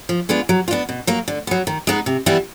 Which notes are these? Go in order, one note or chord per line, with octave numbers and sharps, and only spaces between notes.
F3
G#3 B3 D4 F4
F#3
F4
B3 D4
B2
F#3 A#3
D3
F#3 B3
D#3
G#3 B3 D#4
C3
E3 G3 B3 E4